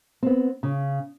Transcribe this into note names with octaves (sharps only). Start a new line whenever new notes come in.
B3 C4
C#3